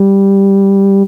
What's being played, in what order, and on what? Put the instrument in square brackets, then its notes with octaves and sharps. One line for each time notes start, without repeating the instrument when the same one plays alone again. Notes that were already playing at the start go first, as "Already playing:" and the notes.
Already playing: [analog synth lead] G3